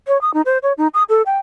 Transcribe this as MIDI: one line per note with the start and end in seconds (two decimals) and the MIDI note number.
0.08 0.20 73
0.21 0.33 87
0.34 0.41 63
0.46 0.58 72
0.63 0.73 73
0.78 0.88 63
0.94 1.03 87
1.09 1.22 69
1.26 1.38 79